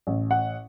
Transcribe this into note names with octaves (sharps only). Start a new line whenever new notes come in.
A1
F#5